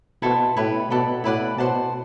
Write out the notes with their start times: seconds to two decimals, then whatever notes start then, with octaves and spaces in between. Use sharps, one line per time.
0.22 B2 E4 A4 C5
0.57 A2 E4 G4 B4
0.90 B2 A4 D5 F#5 B5
1.24 A2 E4 B4 D5 F#5
1.58 B2 C5 F#5 A5